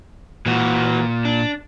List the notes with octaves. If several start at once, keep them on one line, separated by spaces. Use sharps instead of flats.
A#2 E3 F#4
D4